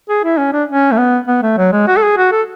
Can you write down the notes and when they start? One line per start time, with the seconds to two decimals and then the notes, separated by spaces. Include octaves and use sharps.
0.09 G#4
0.24 E4
0.38 C#4
0.53 D4
0.68 C#4
0.92 A3
0.98 B3
1.28 B3
1.42 A3
1.58 F#3
1.72 G#3
1.87 F#4
1.97 A4
2.03 G#4
2.17 F#4
2.32 A4